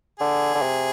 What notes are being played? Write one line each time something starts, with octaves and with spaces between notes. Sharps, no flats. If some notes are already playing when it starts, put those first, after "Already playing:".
D3 G#4
D3
C3